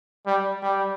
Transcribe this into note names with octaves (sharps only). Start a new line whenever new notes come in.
G3
G3